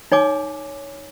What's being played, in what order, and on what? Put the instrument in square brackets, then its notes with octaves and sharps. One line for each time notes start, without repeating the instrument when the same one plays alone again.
[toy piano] D#4 C#5 G#5 D6